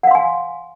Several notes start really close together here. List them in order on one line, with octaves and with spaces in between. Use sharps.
F#5 F5 C6 G#5